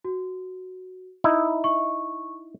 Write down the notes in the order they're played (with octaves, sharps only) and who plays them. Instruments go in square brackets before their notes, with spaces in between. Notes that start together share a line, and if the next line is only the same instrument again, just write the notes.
[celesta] F#4
[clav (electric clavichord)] D#4 E4
[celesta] C#6